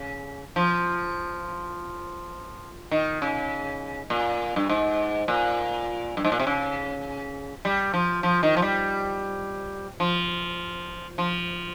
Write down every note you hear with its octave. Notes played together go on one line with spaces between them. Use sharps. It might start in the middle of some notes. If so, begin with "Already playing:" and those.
Already playing: C#3
F3
D#3
C#3
A#2
G2
G#2
A#2
G2
G#2
A#2
C3
C#3
G3
F3
F3
D#3
F3
G3
F3
F3